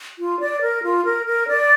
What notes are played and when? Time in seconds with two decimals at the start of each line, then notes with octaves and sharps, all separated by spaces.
0.19 F4
0.40 D5
0.62 A#4
0.83 F4
1.05 A#4
1.26 A#4
1.48 D5